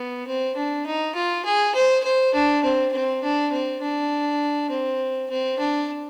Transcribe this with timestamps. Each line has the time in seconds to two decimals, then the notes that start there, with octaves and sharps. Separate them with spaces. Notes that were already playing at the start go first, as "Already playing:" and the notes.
Already playing: B3
0.27 C4
0.56 D4
0.86 D#4
1.15 F4
1.45 G#4
1.75 C5
2.03 C5
2.34 D4
2.63 C4
2.93 C4
3.23 D4
3.52 C4
3.82 D4
4.70 C4
5.30 C4
5.58 D4